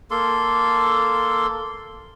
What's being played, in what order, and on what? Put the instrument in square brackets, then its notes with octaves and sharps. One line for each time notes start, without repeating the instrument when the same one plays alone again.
[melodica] A#3 A4 C6